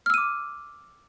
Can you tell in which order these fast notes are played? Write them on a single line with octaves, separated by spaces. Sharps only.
F6 E6 D#7 D6